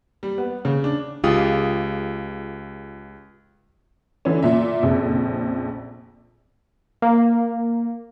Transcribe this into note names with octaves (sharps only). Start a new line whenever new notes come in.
G3
B3
C#3
D4
C#2 F4 G4 G#4 D#6
D3 E3 C#4
A#2 E5
A#1 F2 C#3
A#3